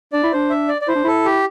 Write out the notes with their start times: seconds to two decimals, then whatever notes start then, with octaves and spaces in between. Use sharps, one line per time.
0.13 D4 D5
0.23 E4
0.32 D4 C5
0.50 E5
0.68 D5
0.81 D5
0.88 E4 C5
0.95 D4
1.04 E4 A4
1.26 G4